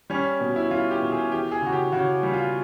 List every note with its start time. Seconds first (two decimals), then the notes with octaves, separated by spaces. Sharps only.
0.10 G3 C#4
0.41 B2
0.56 E4
0.70 G3 F4
0.91 G4
1.02 B2
1.12 G#4
1.32 E3 G4
1.52 G#4
1.62 C#3 F#4
1.72 G4
1.92 C#3 F#4
2.23 G3
2.33 F4